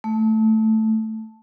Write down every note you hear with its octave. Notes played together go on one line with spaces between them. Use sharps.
A3